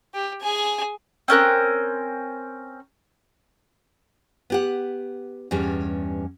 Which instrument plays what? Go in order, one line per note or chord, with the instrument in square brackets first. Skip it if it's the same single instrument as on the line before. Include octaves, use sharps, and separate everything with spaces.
[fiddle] G4
G#4 G#5
[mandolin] C4 C#4 A#4 F#6
[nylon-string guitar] B3 G4 F#5
E2 G2 G3 C#4